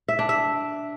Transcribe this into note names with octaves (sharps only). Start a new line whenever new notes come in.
E5
D4
E5